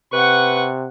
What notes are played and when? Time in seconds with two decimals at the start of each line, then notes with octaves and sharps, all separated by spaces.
0.13 C3 B4 F#5 C#6